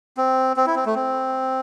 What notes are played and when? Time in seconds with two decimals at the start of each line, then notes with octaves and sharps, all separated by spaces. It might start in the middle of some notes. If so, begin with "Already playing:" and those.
0.17 C4
0.57 C4
0.66 E4
0.76 C4
0.86 A3
0.95 C4